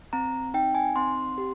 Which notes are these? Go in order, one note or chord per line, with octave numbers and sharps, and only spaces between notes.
C4 A#5
D#4 G5
G#5
C4 C6
G4